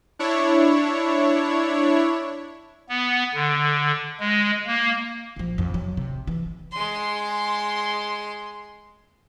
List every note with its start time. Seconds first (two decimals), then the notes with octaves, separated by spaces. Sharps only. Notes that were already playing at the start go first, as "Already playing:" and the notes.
0.19 D4 E4 C#5
2.89 B3
3.34 D3
4.20 G#3
4.66 A#3
5.36 A#1 F3
5.58 F2 F3
5.74 F#3
5.97 C3
6.27 E3
6.72 G#3 C6